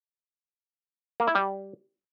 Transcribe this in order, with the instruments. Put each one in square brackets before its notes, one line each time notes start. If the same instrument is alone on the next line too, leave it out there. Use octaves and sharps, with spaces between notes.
[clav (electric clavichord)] A#3
E4
G3